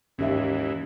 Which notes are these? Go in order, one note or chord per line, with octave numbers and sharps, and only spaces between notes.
D#2 G#2 E3 C#4 G4 E5